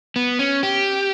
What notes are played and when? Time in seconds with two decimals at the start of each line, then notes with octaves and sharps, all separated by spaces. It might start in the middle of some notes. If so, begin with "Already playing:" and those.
0.16 B3
0.39 C#4
0.63 G4